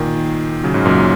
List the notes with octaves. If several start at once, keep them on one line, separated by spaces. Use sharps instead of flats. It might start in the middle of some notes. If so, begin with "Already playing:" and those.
Already playing: A#2 D#3
C#3 F#3
G#2 C#3
F#2 A#2